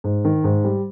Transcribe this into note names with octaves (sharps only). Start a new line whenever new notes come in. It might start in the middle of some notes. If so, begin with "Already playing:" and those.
G#2
D#3
G#2
G3